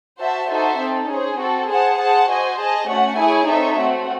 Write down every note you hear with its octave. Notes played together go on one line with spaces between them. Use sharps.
F#4 C5 E5 A5
D#4 F#4 A4 C5 E5
C4 D#4 A4
C#4 G#4 C5
C4 F#4 A4
G#4 C5 F#5 A5
G#4 C5 F#5 A5
F#4 C5 D#5 G#5
G#4 D#5 A5
A3 C#4 F#4 C#5 F#5
E4 G#4 C#5 G#5
C4 D#4 A4 C#5 E5
A3 C4 F#4